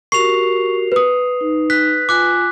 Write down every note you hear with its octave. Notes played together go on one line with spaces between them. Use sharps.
F#4 G4 A#4 C#6 C7 F7
B4 D#6
D#4
F#6 B6
F4 G#5 D6 F#6